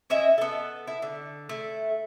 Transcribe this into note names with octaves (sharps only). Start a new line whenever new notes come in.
C#4 E4 D#5 E5
B3 A4
E4
D3
A3 E4